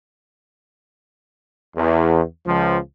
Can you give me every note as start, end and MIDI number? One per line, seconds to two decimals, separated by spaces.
1.77 2.22 40
2.46 2.77 37
2.46 2.77 53